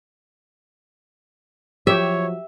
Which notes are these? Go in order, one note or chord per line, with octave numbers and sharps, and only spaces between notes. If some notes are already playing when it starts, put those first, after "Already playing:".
F3 F#3 G4 C#5 E5